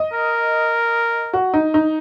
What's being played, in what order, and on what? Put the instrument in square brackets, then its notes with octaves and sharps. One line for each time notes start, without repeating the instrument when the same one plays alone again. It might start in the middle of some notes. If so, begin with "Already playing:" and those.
Already playing: [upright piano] D#5
[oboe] A#4
[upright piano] F#4
D#4
D#4